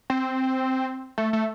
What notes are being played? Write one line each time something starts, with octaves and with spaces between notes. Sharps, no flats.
C4
A3
A3